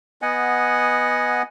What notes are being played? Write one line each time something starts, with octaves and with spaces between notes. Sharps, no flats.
B3 D#5 F#5 G#5